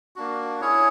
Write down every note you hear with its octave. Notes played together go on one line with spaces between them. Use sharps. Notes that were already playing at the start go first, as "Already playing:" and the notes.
A#3 D4 F#4
C#4 E4 G#4 C#5